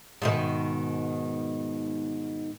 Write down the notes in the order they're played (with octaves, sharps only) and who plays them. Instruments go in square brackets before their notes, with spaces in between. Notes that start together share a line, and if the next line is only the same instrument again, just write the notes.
[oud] G#2 B2 D#3